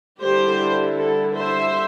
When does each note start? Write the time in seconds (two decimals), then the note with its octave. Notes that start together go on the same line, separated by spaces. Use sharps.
0.22 D3 G3 E4 G4 C5
0.96 A4
1.34 C5 E5